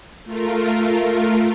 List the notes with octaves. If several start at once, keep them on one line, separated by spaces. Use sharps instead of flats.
A3 F4 A#4